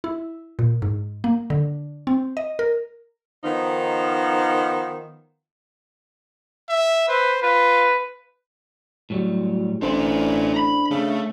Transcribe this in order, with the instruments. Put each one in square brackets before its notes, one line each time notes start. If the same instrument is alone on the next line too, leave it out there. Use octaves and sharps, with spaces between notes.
[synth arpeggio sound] E4
A#2
G#2
A#3
D3
C4
D#5
A#4
[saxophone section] D#3 F3 B3 D#4
[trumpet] E5
[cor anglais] B4 [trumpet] C5
[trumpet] F4 [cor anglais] B4
[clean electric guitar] A2 F#3 G3
[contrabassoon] A1 [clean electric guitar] D4 A4 C5 [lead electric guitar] F4 D5
[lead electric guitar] A#5 B5
[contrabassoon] C#3 [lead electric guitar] A3